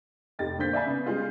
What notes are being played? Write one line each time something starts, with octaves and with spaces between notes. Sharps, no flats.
F1 D#4 G4 A6
A#2 D3 C5 G6 B6
D5 E5 F5 G#5 B5
C#3 B3
C#3 G3 G#3 C#4 F4 G6